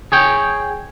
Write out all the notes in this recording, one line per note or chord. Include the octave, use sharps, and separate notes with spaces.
G#4 C#5 G5